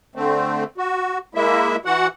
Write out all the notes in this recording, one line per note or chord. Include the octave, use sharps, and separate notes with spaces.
D3 A3 C4
F#4
G#3 A#3 E4 E5
E3 F#4 F#5